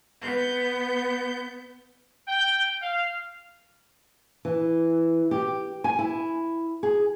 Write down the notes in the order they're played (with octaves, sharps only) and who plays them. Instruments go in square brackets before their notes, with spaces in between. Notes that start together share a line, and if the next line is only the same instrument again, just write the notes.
[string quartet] B3 G6
[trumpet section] G5
F5
[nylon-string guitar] E3
G4
G#5
E4
G#4